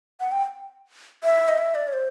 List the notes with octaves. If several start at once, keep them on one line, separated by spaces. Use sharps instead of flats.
F#5
G5
E5
D#5
E5
D5
C#5
C5